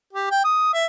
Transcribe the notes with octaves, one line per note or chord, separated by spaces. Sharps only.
G4
G5
D#6
E5